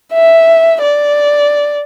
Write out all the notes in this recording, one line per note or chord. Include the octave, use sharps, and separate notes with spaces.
E5
D5